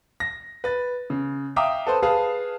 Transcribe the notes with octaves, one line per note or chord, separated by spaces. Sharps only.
A#6
B4 A6
C#3
E5 F5 G5 A#5 D6 D#6
A4 B4 C5
G#4 B4 F5 A5